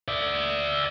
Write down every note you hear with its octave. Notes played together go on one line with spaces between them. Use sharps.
D5 E5